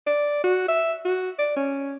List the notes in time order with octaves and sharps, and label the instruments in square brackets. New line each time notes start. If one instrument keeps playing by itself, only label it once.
[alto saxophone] D5
F#4
E5
F#4
D5
C#4